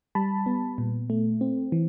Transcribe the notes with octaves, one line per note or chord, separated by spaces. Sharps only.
G3 A5 B5
B3
A#2
A3
C4
E3